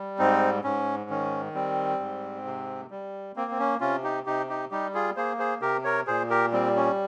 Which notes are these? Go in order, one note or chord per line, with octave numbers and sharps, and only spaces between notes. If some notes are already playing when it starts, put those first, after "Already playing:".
Already playing: G3
G#2 C4 D#4
G#2 C#4
D#3 C#4
G3 C4
G#2
C3
G3
A#3 C4
C4
C#4
C3 C#4 F4
D#4 G4
C3 D#4 G4
D#4 G4
G3 D#4 G4
F4 G#4
A#3 G#4 C5
G#4 C5
C3 G4 A#4
A#4 C#5
A#2 G#4 C5
G4 A#4
G3 C4
C#4